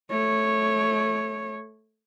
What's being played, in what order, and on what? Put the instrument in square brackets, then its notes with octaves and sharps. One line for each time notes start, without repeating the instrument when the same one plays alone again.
[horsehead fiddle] A3 C#5